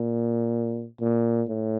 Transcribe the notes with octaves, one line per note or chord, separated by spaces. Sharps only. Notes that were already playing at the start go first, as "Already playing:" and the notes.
Already playing: A#2
A#2
A2